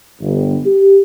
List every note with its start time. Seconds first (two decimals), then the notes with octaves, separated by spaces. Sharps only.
0.21 G1
0.65 G4